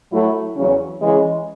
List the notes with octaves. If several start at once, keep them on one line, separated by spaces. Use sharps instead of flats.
A2 F#3 A3 E4
E2 C#3 F#3 C#4
C#3 E3 G#3